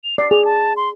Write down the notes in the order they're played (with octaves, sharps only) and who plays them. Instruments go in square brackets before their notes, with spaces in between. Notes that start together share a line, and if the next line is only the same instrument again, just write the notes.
[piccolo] F7
[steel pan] D5 [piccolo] C7
[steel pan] G#4 [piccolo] F7
[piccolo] A5
C6